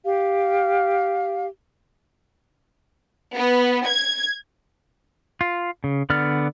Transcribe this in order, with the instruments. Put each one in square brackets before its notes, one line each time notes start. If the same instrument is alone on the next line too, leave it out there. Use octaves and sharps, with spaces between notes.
[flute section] G4 F5
[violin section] B3
G#6
[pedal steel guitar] F4
C#3
D3 B3 D5 F6